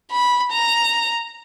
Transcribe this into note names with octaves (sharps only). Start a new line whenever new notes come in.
B5
A#5